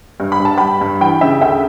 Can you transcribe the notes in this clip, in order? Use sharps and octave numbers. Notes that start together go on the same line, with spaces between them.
G2
B5
G2
A5
G2 G5 B5
G2
E3 G5 B5
C#3 E5 G5
D2 E5 G5